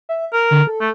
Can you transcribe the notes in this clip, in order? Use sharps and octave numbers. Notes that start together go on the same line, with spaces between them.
E5
A#4 F6
D3
A4
A3